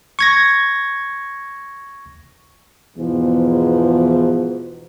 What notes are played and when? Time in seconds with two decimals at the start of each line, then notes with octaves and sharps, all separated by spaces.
0.19 C#6 G#6 A#6
2.97 E2 G#2 B2 E3 F3